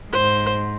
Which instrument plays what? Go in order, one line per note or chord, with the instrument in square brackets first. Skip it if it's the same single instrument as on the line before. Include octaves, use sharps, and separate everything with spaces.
[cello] G#2 [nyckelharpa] C5